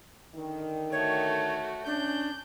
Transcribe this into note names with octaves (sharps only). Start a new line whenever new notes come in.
D3 D#3
A3 F#4 C#5
C#4 D4 G6